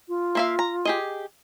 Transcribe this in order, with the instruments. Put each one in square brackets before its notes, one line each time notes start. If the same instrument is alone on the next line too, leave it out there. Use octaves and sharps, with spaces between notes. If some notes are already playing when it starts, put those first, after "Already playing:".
[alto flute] F4
[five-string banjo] A#3 E5 F5
A#5
G4 G#4 D#5